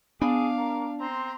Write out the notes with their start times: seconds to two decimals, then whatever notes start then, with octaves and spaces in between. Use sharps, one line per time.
0.22 B3 D4 G#4 F5 D6
0.58 A#4
1.00 C4 A#5 C6